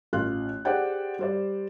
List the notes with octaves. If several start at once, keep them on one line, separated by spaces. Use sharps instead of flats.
A1 F4 F5 F#6
G4 G#4 C5 D5 F#5 G5
G3 C5 D5